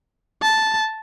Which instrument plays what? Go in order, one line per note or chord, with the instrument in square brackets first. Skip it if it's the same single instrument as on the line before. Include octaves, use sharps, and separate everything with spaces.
[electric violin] A5